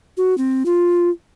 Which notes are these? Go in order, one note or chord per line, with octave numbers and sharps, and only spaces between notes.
F#4
C4
F4